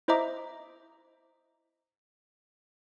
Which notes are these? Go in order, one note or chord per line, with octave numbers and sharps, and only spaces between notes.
E4 C5 D#5 E5 A#5 D6